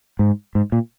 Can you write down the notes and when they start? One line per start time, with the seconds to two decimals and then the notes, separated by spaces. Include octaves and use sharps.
0.19 G#2
0.55 G#2
0.72 A#2